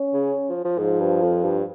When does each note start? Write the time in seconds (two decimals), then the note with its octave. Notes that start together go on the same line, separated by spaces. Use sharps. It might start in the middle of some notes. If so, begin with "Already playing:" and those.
Already playing: C#4
0.13 C#3
0.49 F3
0.64 F3
0.78 G#2 F3
1.00 G2
1.22 F2
1.44 G2